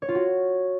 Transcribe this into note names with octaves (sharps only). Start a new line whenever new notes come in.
C#5
F4
F#4